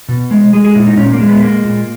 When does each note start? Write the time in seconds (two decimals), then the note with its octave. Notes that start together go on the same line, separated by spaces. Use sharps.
0.09 B2
0.31 G#3
0.53 G#3 G#4
0.65 G#4
0.75 A#2 E4
0.87 D#4
0.97 A#2 C#4
1.13 A#3
1.20 G#3
1.28 B3
1.42 G#3 A#3
1.64 A#2